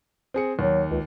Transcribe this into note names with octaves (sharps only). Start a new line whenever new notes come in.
C4 G#4 C#7
D#2 F#3
C#2